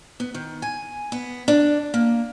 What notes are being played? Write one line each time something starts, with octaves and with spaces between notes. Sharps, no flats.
B3
D#3
G#5
B3
D4
A#3